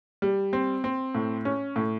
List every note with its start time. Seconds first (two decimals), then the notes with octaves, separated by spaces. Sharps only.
0.22 G3
0.53 C4
0.84 C4
1.15 A2
1.45 C#4
1.76 A2